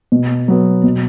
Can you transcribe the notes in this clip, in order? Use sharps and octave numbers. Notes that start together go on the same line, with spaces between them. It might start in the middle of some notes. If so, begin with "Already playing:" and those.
B2
F#3 B3
B2